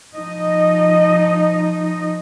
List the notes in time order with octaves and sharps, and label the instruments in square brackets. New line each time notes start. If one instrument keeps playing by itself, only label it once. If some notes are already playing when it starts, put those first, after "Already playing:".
[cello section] F3 D#4 D#5